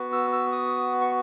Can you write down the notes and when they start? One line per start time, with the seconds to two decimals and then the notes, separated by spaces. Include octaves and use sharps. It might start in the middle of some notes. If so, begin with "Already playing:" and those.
Already playing: B3 F#4
0.13 E6
0.33 E6
0.52 D#6
1.01 C#6